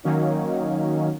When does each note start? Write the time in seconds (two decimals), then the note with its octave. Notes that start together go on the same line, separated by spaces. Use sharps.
0.04 D#3 F#3 A#3 C#4 D#4